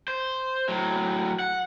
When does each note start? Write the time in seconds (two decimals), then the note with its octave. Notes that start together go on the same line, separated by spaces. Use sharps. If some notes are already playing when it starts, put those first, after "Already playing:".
0.08 C5
0.69 A2 F#3
1.39 F#5